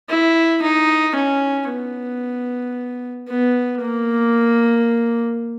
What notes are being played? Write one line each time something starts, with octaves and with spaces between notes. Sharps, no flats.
E4
D#4
C#4
B3
B3
A#3